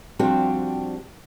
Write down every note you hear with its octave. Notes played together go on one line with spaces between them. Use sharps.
F3 G3 C4 D4 F#4 G4